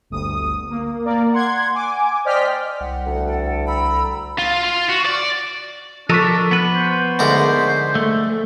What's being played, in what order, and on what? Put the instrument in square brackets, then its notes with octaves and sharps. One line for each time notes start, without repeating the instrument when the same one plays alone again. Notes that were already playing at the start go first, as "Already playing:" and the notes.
[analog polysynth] G1 D2 D#6
A#3
A#3 A#4 D5
F#5 C6 G#6
G#5 D6
C5 D5 D#5 G5 F6 B6
[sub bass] C2 [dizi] F#5
[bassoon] D2
[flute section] A4 G5
[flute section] G5 A#5 E6 [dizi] B5
[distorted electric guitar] F4
F4
F#4
D5
[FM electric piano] F3 C#6 B6 [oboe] D4 [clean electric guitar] A4 A#4 D#5
[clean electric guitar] B3 B4
[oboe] C5
[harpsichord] D2 G#2 A#4
[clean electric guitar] A3